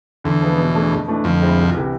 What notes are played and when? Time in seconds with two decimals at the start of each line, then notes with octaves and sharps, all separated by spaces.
0.24 E2 D3
0.41 F3 G#3 B3
0.58 B2
0.74 A3 D4 G#4
0.91 F2
1.08 E3 A3 D4
1.24 F2 D3
1.41 G#3 C4 E4 G#4
1.57 C2
1.74 C3 E3